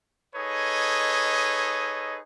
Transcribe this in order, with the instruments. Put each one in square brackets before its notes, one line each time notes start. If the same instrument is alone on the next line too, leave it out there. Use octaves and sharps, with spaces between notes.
[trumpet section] D#4 G#4 A4 B4 C#5 D#5